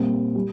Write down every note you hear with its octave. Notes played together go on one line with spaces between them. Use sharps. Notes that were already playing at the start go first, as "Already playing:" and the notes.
Already playing: A#2 G3 C4
G3